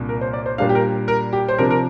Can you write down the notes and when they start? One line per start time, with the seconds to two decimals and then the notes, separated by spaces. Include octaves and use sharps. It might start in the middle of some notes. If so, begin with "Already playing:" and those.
Already playing: C2 A#2 A#3 D4
0.09 A#4
0.21 C5
0.33 D5
0.46 C5
0.58 A#2 G3 D4 F5
0.69 G4
0.75 A#4
1.08 A#4
1.33 G4
1.49 C5
1.58 C3 F3 D4 A#4
1.70 A#4